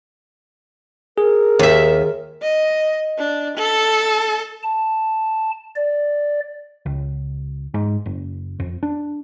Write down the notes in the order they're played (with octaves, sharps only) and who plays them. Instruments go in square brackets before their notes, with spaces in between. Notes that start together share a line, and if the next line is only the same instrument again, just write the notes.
[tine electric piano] G#4 [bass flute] A#4
[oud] D#2 E5
[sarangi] D#5
D4
A4
[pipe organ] A5
D5
[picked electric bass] C#2
G#2
F#1
F2
D4